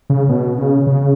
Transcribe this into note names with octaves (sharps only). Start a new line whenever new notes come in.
C#3
B2
C#3
C#3